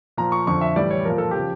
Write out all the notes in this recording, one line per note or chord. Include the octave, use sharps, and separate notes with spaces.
A#2 F3 A#5
C#6
F2 D3 F3 C#6
E5
A2 E3 G3 D5
C#5
A#2 F3 A#4
A4
G4
C#3 F3